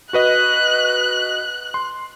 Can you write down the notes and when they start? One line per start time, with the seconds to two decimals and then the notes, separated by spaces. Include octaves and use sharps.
0.13 F#4 B4 D#5 F#6
1.74 C6